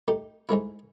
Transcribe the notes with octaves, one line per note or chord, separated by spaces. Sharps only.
A3 D#4 G4
G#2 G#3 A3 E4